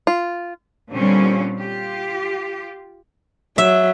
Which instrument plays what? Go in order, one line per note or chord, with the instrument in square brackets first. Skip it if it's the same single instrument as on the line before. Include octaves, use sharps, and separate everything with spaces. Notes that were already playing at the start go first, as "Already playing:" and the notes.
[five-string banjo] F4
[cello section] A#2 D3 G3 C4 C#4
F4 G4
[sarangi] F#3 [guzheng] E5